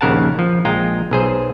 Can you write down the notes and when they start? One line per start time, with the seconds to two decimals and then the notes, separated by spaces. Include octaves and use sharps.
0.01 A#1 D#2 C#3 A#4 F#5 A5
0.39 F3
0.65 A#1 G#3 F4 G5 A#5
1.11 B1 G#4 C5